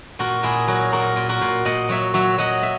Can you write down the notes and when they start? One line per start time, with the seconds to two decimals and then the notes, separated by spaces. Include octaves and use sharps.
0.19 A#2 F#4 A#4
0.43 A#2 E4 G#4
0.67 F#3 F#4 A#4
0.92 A#2 F#4 A#4
1.16 A#2
1.29 F#4 A#4
1.41 A#2
1.65 A#2 D#5 F#5
1.89 F#3 C#5 E5
2.14 F#3 C#5 E5
2.38 F#3 D#5 F#5
2.63 E5